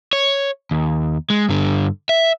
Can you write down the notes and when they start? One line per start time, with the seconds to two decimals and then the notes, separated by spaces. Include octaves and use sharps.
0.13 C#5
0.71 D#2
1.30 G#3
1.49 G2 D3
2.09 E5